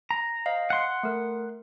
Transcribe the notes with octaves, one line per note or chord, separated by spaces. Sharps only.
A#5
C5 D#5 F5
F#5 C6 C#7
A3 A#4